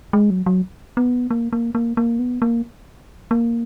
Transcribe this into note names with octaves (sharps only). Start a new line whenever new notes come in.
G#3
F#3
F#3
B3
A#3
A#3
A#3
A#3
B3
A#3
A#3